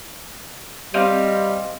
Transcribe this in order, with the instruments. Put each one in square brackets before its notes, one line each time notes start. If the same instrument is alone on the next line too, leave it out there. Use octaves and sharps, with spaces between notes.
[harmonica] G3 [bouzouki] C4 D#5 F5